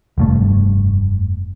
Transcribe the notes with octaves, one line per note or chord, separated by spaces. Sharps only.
F1 G2 A3